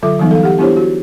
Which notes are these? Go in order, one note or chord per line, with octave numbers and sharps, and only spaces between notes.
D3 F#3 F4 A4 E5 D6
E3 F#3 G3 B3 D#4
A4 F5
G4 F#5
B3 D4 E4 G4 C5 C#5
F#4